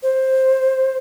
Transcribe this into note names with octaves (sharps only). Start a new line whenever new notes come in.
C5